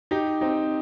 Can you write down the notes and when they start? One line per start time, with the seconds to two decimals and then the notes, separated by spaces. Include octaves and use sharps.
0.11 D#4 G4
0.41 C4 D#4